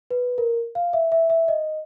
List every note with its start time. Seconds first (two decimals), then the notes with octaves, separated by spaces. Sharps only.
0.11 B4
0.38 A#4
0.75 F5
0.93 E5
1.12 E5
1.30 E5
1.48 D#5